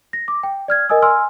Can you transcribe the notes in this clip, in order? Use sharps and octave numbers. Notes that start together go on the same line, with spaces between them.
A#6
D6
G5
D5 F6 G#6
A#4 D#5 G#5 D#6 E6
G#5 C6 E6 F6